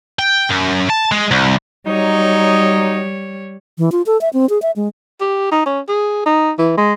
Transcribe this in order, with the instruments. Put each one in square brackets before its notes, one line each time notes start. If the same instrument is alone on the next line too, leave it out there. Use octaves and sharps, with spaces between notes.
[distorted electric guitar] G5
F#2
A5
G#3
C2
[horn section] F#3 D#4 [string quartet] G3 C#5
[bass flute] E3
F4
A4
E5
C4
G#4
E5
G#3
[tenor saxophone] G4
D#4
C#4
G#4
D#4
E3
G#3